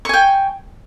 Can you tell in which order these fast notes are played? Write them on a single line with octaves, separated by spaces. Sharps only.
C#6 G#5 G5